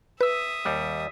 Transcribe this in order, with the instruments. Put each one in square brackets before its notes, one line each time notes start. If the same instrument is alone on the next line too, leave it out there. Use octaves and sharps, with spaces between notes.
[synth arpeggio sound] B4 E6 [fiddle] E5 D#6
[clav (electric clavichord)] D#2 G3